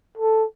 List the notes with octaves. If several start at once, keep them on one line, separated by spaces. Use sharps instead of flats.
A4